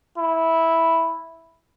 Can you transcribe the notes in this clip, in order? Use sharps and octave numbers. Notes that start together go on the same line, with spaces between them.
E4